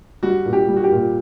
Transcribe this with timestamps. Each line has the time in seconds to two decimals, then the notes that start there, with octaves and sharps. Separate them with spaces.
0.23 G3 F#4
0.45 A#2
0.53 G4
0.68 G3
0.76 F#4
0.84 G4
0.92 A#2